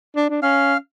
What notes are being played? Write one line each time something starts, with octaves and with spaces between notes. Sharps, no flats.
D4
D4
C#4 F5